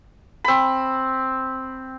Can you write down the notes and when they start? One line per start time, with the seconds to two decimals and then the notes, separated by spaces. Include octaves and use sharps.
0.44 C4 B5